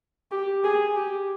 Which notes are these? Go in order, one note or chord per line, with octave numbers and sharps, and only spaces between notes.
G4
G#4
G4